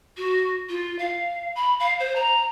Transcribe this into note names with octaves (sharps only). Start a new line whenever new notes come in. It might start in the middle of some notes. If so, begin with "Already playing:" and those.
F#4
F4
F5
B5
F5
C5
A#5